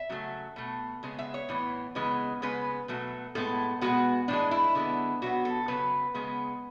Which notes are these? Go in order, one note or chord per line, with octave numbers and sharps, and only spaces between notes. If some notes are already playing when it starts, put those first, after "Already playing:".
Already playing: E5
C#3 F#3 A3
B2 A3
C#3 G#3 B3
E5
C#5
A2 E3 B3
C#3 E3 G#3 B3
C#3 G#3 B3 B4
B2 F#3 A3
A2 G#3 B3 A4
B2 G#3 B3 F#4
A2 E3 G#3 D4
E4
D3 G#3 B3
B2 F#3 B3 F#4
A4
C#3 F#3 B3 B4
C#3 G#3 B3